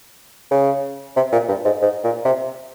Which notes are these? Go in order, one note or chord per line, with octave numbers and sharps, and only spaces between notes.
C#3
C3
A#2
G2
G#2
G#2
A#2
C3